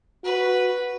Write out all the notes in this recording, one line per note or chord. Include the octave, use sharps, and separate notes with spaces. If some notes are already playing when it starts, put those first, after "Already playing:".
F#4 B4